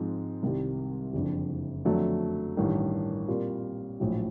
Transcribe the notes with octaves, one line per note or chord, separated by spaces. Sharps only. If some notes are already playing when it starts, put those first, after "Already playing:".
Already playing: G#2 F3 G#3 C4
C2 C3 D#3 G3 C4
F#1 F2 D3
F2 D3 F#3 A3 D4
A1 G2 D#3
A#2 G3 C4 F4 A#4
A#1 A2 F#3